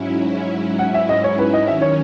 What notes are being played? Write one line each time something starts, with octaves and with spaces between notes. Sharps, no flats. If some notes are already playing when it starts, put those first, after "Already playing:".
Already playing: G#2 F#3 C#4 E4
F#5
E5
D#5
C#5
B4
D#5
D#3 F#3 C#4 E5
C#5